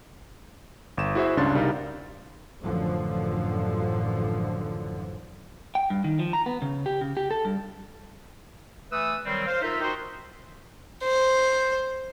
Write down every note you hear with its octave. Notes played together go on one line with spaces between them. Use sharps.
G1 E7
E4 F#4 G#4 C5 E5
C#2 G2 C#3 D4 C6 A6
C2 G3 D#4 A#4 F5
A1 F#2 D3 F3
G5
G2
D#3
F3
A#5
B3
C#3
G4
C#3
G4
A4
G2
E3 A3 B4 D#6 E6
D#3 F#3 G3 C4
C5 F5
D#4 F4 A#4 E5
D#4 F#4 A#4 C5 D#5 G5
C5